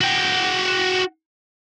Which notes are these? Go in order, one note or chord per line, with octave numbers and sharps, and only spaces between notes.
F#4 G5